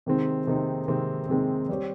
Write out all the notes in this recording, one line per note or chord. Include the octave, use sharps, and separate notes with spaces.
C3 D#3 G#3 C4 D#4
C3 D#3 G#3 C4 D#4
C3 D#3 G#3 C4 D#4
C3 D#3 G#3 C4 D#4
G3 C4 G4 C#5